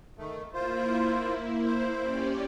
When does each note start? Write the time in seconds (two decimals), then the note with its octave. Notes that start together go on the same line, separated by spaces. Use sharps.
0.18 D#3 A3
0.54 A#3 E4 F4 C5
1.65 C5
1.98 C#4 G4 D5